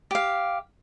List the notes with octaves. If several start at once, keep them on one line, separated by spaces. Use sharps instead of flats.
G4 F5